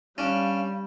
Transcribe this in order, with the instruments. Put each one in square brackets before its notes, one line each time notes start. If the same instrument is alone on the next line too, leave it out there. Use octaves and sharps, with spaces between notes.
[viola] G3 [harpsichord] C#4 D4 [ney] F5